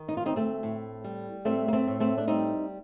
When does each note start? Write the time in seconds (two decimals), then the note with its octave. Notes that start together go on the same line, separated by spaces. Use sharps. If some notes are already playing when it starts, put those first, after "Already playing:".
Already playing: D#3
0.09 D#4
0.17 F4
0.22 D2 C4 D#4
0.36 A3 C4
0.63 A2
1.04 G3
1.45 A2 A3 C4
1.68 A#3
1.73 A3 C4
1.87 A2
2.00 A3 C4
2.18 D4
2.27 G3 C4 D#4